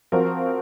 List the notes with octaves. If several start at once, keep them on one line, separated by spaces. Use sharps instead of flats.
F3 C4 F#4 A#4